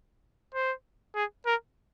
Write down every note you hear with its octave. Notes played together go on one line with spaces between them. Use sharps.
C5
G#4
A#4